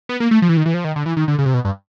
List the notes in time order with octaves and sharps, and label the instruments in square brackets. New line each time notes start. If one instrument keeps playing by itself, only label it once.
[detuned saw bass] B3
A#3
A3
F3
E3
D#3
E3
F3
D#3
D3
E3
D#3
D3
C#3
C3
B2
G2